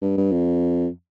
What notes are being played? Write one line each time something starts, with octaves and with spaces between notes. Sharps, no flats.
G2
G2
F2